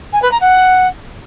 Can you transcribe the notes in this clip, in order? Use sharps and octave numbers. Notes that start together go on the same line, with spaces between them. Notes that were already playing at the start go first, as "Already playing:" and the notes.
G#5
B4
A#5
F#5